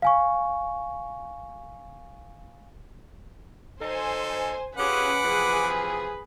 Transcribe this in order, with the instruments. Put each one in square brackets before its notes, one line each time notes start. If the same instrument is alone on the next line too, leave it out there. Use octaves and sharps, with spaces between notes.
[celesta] F5 G#5 C#6
[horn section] F#3 D#4 A4 [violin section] C5 G#5
[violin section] C#4 [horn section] F4 G4 G#4 [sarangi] B4 [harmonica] F#5 D6
[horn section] C3 E3 F3 [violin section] G#4